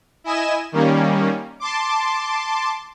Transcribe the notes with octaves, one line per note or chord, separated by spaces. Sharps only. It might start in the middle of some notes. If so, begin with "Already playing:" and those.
E4 D#5 G#5 E7
D#3 G3 A#3 C#4
A5 C6 D6